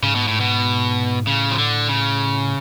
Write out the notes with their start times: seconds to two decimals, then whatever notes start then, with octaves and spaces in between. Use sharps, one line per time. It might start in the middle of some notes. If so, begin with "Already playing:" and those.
0.03 G#2 C#3
0.15 B2
0.28 A2
0.41 B2
1.27 A2 C#3
1.51 F3
1.59 D3
1.89 C#3